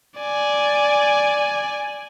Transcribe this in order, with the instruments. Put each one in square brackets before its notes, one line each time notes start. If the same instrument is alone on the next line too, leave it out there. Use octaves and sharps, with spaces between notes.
[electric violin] D5 G#5